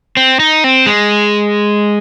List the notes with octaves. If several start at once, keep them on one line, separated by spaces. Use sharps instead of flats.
C4
D#4
C4
G#3